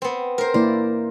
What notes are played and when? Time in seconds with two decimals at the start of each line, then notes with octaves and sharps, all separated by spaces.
0.02 B3 C4
0.38 A#4 C5
0.54 A#3 E4 C5 D5